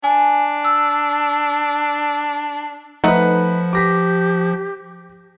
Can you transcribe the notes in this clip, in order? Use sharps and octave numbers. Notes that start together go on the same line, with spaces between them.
D4 G#5
E6
F3 A3 D#4 B4 F#5
G4 D6 A#6 B6